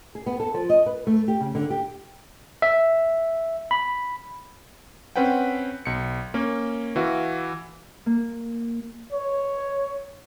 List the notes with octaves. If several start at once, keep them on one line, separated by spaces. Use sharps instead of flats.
G#4
B3
A4
F3
D#5
B4
A3
G4
C#3
D3
G4
E5
B5
C4 C#4 B4 F#5 G5
B1 C#7
A#3 C#4
E3 F#4 E5 F5
A#3
C#5